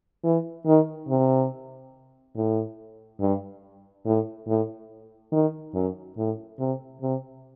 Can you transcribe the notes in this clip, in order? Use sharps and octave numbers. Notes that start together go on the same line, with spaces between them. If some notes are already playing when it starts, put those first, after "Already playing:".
E3
D#3
C3
A2
G2
A2
A2
D#3
F#2
A2
C3
C3